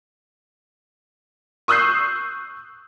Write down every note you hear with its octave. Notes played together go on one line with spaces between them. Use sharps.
C#6 D#6 E6 F#6 G6 C7